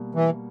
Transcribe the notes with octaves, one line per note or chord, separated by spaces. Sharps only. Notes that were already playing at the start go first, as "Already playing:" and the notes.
Already playing: B2 G3 A#3
E3